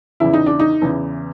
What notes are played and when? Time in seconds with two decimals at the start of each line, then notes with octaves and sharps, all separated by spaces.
0.20 E2 C#3 E3 E4
0.33 D#4
0.46 D4
0.60 D#4
0.82 E2 C#3 E3